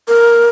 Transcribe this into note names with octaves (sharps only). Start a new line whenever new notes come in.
A#4